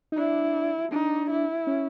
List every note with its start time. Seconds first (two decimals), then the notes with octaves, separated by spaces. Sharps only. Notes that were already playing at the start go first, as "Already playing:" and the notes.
0.12 D#4
0.17 D4 E4
0.92 D4 D#4
1.31 E4
1.67 C#4